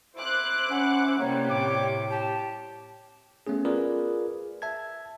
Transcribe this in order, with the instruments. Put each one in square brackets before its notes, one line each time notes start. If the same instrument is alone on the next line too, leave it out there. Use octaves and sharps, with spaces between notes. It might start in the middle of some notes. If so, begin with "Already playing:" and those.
[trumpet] E4 [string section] C5 D6 F#6
[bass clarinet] C#4 [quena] F#5
[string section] C3 G3 [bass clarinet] A#3 [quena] C#5
[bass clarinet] A2 [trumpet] D6
[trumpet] G4 [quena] A5
[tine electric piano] A3 B3 C#4 G#4
F4 G#4 A#4 B4 D5
E5 A5 G#6